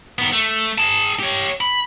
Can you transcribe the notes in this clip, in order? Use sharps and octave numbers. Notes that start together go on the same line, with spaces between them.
D#3 B3
A3
G#4 A5
G4 C#5
B5